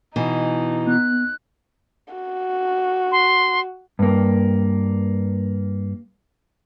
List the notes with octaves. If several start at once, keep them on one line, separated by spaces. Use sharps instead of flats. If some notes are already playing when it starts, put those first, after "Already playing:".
B2 E3 D#4
B3 F#6
F#4
C6
G2 A#3